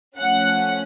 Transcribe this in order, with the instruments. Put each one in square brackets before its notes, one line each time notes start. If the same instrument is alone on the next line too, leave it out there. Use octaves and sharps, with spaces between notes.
[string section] F3 A3 C#4 F#5